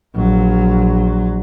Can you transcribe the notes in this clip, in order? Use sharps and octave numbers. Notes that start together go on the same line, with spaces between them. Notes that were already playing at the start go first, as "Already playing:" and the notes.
A#1 F#3